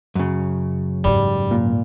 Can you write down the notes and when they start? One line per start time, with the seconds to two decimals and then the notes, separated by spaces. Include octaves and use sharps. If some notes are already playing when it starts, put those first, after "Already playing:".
0.16 F#2 C#3
1.04 E2 G#2 G3
1.51 A#2